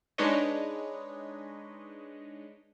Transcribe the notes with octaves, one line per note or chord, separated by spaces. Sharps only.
G#3 D4 D#4 B4 C#5 D#5